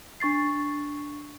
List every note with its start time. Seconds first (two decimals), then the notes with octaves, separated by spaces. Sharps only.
0.20 D4 C#6 A6 C7